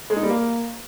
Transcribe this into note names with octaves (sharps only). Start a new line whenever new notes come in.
G#3
D#4
G3
A#3